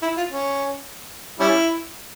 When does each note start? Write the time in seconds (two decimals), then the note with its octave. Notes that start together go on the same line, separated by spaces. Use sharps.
0.02 E4
0.17 F4
0.32 C#4
1.40 G3 C#4 E4